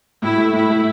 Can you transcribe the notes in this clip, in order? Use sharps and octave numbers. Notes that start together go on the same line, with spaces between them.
A2 E4
A3
A2 E4
A3